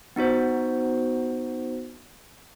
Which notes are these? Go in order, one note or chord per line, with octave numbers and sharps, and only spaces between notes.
B3 D#4 F#4 C5